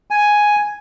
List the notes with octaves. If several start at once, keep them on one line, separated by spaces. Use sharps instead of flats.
G#5